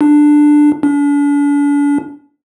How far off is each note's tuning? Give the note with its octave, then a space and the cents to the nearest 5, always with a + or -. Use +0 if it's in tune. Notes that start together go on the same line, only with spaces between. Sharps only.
D4 +10
D4 -40